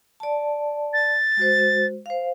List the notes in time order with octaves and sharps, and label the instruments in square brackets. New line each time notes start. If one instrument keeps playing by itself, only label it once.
[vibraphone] D5 A5
[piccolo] A6
[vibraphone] G#3 F#4 C5
C5 F5